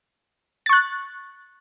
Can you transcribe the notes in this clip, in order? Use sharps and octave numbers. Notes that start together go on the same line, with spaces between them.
C#6 F#6 A6